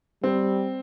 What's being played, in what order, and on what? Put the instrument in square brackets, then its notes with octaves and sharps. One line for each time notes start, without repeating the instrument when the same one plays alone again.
[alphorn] G3 [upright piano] C4